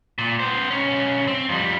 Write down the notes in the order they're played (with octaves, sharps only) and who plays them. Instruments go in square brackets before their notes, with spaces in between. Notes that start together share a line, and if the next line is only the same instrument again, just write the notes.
[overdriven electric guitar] A#2
B3 C5
B1 C#4
C4
F2 G3